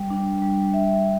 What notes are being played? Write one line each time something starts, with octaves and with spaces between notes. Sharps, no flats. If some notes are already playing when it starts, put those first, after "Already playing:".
Already playing: G3
D4
G3
E5